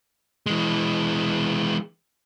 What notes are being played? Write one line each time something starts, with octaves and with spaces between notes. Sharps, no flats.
E3 G#3